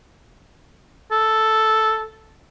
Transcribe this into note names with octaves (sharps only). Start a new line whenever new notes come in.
A4